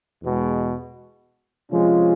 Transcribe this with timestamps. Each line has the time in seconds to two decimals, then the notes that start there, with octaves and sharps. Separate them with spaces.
0.22 E2 B2 G#3
1.71 C3 F3 G#3 C#4 F4